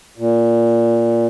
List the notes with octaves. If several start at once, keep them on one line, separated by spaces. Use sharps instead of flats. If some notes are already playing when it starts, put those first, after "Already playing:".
A#2